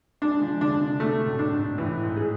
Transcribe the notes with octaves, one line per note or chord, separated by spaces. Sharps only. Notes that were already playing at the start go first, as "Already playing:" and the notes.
G#3 D4
G#3
F3
D3 D4
C3
B2 A3
A2
D4
G#2
A2 E3
G#2
G#4